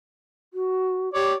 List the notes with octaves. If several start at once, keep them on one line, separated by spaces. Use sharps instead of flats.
F#4
G4 C#5 D5